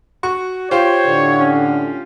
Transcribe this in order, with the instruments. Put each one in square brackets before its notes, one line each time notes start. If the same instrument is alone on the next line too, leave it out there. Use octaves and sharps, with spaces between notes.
[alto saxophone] F#4 [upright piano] C#6
[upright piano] F4 G4 [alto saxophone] C5 [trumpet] C#5
[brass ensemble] A2 D3
[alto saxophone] C#4